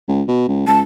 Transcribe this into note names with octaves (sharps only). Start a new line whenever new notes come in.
C#2
B2
C#2
C#2 A5